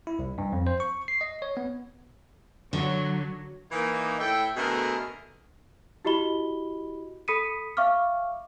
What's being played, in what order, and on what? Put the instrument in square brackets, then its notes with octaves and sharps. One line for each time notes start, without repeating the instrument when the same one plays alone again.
[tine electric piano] E4
C2
G2
F2
C5
C#6
C7
D#5
C#5
B3
[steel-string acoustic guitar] D3 [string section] F#3
[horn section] E3 A#3 D#4
A2 E4 A4 G5
B2 D3 A3 G#4 A#4 D#5
[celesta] E4 F#4 G4 D#5 B5 G7
A4 B5 D#6 B6 C#7 D#7
E5 F5 C#6 D6 F6